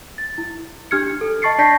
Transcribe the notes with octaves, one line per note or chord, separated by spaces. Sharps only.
A6
E4
D4 G4 F6 G#6 C#7
A4
D#5 A5 C#6 A6 C7 C#7
D4 D5 A5 G6 A#6 B6